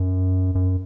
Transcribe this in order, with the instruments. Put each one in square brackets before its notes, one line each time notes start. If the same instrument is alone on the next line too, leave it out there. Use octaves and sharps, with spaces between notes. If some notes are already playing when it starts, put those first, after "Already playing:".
Already playing: [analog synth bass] F#2
F#2